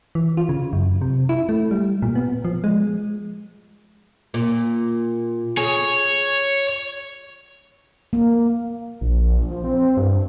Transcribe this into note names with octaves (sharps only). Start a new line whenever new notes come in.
E3
F4
C#3
F#2
C3
E4
A3
G3
A#2
B3
F3
G#3
A#2
G#4 C#5
A#3
A#1
F3
C4
G2